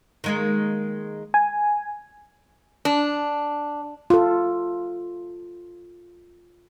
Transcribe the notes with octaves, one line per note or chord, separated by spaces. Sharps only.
D#3 G#3 A#3
G#5
D4
F4 A4